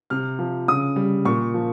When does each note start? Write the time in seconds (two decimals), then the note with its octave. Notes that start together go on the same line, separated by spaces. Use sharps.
0.10 C3 F6
0.39 F3
0.68 C#3 D#6
0.96 G3
1.25 A#2 C#6
1.54 F3